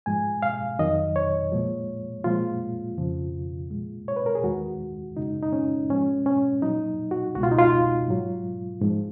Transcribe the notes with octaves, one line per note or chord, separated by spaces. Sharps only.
G#2 F3 G#3 G#5
F5
F2 D#3 F#3 D#5
C#5
A#2 F3 G#3
A#2 F3 G#3 F4
F2 C#3 F3
A#2 G#3
C#5
B4
A#4
G#4
D#2 D#3 G#3 F#4
F#2 C#3 G#3 D#4
D#4
C#4
G#2 F3 G#3 C#4
C#4
A#2 F#3 D#4
F#4
C#2 B2 G#3 F#4
F4
D#4
F4
G#2 F#3
G#2 F3 G#3